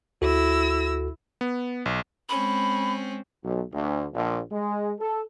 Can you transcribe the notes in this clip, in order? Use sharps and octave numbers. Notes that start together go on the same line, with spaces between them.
D2 E4 F#4 A4 E6 A#6
B3
B1
G#3 C4 C#4 B5
B1
D2
A#1
G#3
A4